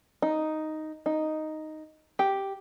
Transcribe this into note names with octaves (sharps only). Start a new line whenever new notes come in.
D#4
D#4
G4